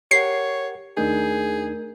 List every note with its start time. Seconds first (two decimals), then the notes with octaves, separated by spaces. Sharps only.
0.11 G4 A#4 C#5 F#5 C7
0.97 D#2 A3 D4 D#4 G#4 A#4 G6